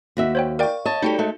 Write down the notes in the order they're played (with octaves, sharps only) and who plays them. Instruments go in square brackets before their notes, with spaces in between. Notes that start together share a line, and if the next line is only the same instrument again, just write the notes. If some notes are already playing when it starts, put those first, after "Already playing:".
[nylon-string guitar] D#2 F#4 E5
[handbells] C5 C#5 G5
[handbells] A#4 D5 G5 [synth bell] F5 C#6
[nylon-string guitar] C#5 [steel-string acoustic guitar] D#5 A5
[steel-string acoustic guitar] G3 A3 G4 [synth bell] D#4 F#4 A4
[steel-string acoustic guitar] G#3 A3